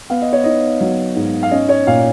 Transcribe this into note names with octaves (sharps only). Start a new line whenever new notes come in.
B3 F5
D#5
C#5
D#4 D#5
F#3
G#2
F5
C#4 D#5
C#5
A#2 F5